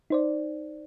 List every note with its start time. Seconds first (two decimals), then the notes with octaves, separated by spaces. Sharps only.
0.10 D#4 C5 D5